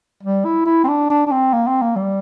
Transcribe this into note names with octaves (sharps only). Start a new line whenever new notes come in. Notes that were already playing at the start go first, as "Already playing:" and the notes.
G3
E4
E4
C4
D4
D4
D4
C4
A#3
C4
A#3
G3